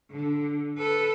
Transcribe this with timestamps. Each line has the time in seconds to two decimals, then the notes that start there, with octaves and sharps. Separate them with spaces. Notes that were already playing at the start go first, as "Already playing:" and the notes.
0.11 D3
0.78 A4 B4